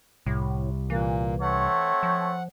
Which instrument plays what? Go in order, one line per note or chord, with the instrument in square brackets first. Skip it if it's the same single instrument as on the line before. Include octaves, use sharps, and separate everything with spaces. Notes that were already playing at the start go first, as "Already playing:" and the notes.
[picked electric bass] C2 [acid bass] A2
[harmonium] A#2 A#3 [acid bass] E3
[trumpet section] A3 C4 C#5 [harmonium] F#5
[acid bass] F3